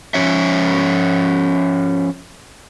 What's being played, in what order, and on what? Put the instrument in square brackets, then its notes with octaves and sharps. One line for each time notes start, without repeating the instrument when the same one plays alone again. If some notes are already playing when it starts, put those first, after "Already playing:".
[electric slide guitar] F3 C#4 C#5 E5